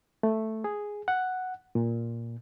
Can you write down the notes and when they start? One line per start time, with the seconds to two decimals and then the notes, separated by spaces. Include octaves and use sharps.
0.23 A3
0.64 G#4
1.08 F#5
1.75 A#2